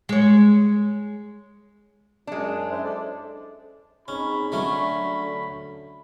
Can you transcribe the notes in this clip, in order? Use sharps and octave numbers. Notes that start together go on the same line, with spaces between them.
G#3 C#5
F#2 G#3 D4
E4 C5
A4 D5
C4 C#4 D#4 G#4 B5
D3 F#3 A3 C#4